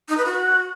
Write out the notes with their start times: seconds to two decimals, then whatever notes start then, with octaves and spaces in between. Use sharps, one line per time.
0.09 D#4
0.17 B4
0.26 F#4